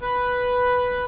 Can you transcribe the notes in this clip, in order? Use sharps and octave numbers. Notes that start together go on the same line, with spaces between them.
B4